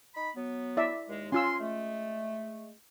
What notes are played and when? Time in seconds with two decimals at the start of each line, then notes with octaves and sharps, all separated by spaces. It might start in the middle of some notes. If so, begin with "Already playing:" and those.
0.15 D#4 B5
0.35 F#3 B3
0.77 E4 D5 E5
1.09 D#2 G#3
1.32 C#4 F4 G#5 C6 E6
1.60 G#3 A3